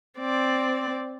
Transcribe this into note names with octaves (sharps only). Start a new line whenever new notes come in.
C4 D5